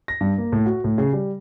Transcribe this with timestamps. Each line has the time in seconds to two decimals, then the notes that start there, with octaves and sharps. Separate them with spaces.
0.08 A#6
0.21 G2
0.38 A#3
0.52 A2
0.66 F#4
0.84 A2
0.98 C#3
1.13 G3